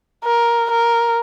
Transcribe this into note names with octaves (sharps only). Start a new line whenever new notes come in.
A#4
A#4